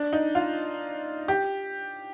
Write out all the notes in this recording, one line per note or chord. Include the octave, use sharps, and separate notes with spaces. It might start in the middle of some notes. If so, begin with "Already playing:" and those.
Already playing: D4
D#4
F4
G4